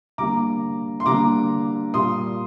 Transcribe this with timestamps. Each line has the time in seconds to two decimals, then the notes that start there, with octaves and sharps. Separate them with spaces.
0.18 D3 G3 A#3 A#5 D6
1.00 C6
1.06 D3 G3 A#3 A#5 D6
1.94 A#2 G3 A#3 C6 D#6